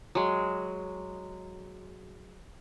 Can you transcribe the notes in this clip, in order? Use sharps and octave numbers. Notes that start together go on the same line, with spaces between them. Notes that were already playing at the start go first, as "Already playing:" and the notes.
F#3 G#3